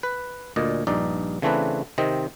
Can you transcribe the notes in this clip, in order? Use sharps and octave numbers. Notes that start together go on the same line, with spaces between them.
B4
D2 A#2 D5 D#5
A#1 G2 D#4 D5
C#3 E3 A3 C4 D4 B4
C3 D#3 C4 D#5